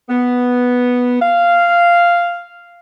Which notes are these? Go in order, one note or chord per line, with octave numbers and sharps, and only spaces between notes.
B3
F5